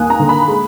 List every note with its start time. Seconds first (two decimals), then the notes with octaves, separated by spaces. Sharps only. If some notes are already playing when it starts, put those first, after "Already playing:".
Already playing: D#2 A#3 G#5 D#6 F#6
0.10 A#5
0.20 D3
0.29 B5
0.48 G#3